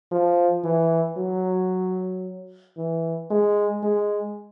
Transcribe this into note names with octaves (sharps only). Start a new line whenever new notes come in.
F3
E3
F#3
E3
G#3
G#3